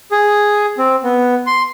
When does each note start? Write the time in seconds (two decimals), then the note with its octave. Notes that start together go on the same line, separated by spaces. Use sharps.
0.12 G#4
0.78 C4
1.04 B3
1.47 C6